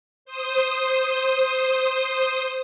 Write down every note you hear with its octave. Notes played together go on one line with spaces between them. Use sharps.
C5 D#6